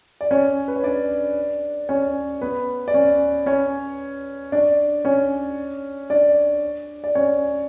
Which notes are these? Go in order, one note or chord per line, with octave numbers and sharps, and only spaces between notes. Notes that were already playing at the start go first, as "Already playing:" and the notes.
D5
C#4 C#5
B4
C#5
D4 D5
C#4 C#5
B3 B4
D5
C#4 C#5
C#4 C#5
D4 D5
C#4 C#5
D4 D5
D5
C#4 C#5